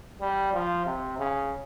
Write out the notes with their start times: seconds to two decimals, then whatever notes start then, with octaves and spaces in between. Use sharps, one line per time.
0.21 G3
0.53 F3
0.86 C3
1.18 C#3